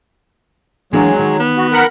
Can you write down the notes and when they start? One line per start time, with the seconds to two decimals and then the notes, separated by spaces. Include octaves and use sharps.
0.93 E3 F#3 G#3 A#3 D4
1.19 D#3
1.40 B3
1.57 F#4
1.72 A#4 F#5 B5